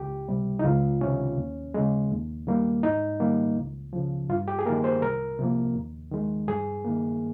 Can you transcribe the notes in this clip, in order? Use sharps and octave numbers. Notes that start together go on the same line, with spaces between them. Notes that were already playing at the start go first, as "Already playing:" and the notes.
Already playing: C#2 G4
C3 G3
D#4
C#2 F4
C3 D#3 C#4
D#2
C#3 G#3
D#2
D#3 G3 A#3
G#2 D#4
D#3 G3 A#3
C#2
C#3 F3
G2 F4
G4
G#4
D#3 A#3 A#4
C5
C2 A#4
C3 F3 A#3
D#2
D#3 G#3
G2 G#4
D#3 A#3